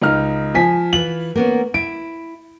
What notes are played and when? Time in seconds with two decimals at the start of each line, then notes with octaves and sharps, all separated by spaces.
0.02 C#2 D#4 F6
0.55 F3 G#5 B6
0.93 E3 F4 F#7
1.36 A#3 B3 C#4
1.74 E4 D7